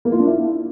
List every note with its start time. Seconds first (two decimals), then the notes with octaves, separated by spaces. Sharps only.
0.05 A#3
0.12 F4
0.19 D4
0.26 E4